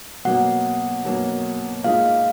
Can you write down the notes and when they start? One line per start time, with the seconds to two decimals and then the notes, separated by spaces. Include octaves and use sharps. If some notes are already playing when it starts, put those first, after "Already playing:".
0.25 B2 F#3 A#3 F#5
1.05 B2 F#3 A#3
1.84 A#2 G#3 D#4 F5